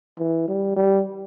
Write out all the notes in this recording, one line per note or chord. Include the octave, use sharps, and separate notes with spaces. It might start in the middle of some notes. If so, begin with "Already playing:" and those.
E3
G3
G3